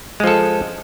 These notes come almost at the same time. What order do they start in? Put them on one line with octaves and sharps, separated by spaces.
G#3 F3 A4